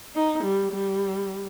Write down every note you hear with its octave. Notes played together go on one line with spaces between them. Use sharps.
D#4
G3
G3